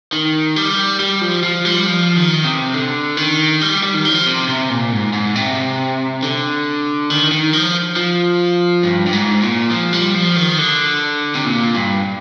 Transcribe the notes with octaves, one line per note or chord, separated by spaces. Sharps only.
D#3
G3
G3
F3
F3
G3
F3
D#3
C3
D3
D#3
G3
G3
D#3
F3
C3
C3
A#2
G#2
G#2
C3
D3
D#3
D#3
F3
F3
G2
G2
G#2
A#2
F3
G3
F3
D#3
D3
C3
A#2
G2